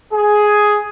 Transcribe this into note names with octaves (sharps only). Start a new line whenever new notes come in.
G#4